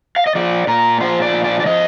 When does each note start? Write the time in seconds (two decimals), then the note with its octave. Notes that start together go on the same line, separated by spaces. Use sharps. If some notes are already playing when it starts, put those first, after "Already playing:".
0.16 F5
0.27 D#5
0.35 F3 D5
0.67 A#2 A#4
1.00 F3 C5
1.22 D5
1.34 A#2
1.44 D5
1.60 D5
1.65 F3 D#5